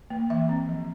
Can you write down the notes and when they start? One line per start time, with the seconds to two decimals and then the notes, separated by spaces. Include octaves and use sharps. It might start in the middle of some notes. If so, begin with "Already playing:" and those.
0.10 A#3
0.30 E3 E5
0.49 C4
0.69 F3